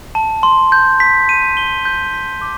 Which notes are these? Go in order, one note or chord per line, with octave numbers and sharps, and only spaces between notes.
A5
C6
G6
B6
D#7
G7
G6
B6
D6